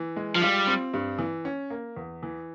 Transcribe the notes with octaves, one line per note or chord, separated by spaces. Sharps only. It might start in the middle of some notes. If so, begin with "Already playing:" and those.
Already playing: E3
G#3
F3
G3 F4
C4
G2
E3
C#4
A#3
E2
E3